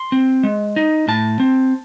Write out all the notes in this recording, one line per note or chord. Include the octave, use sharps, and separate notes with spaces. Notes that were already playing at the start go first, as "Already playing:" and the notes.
Already playing: C6
C4
G#3
D#4
A2 A5
C4